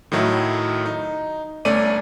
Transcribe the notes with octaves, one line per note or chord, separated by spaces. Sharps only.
A2 D#3 F#3 A3 E4
D#4
G1 A3 C#4 D5 D#7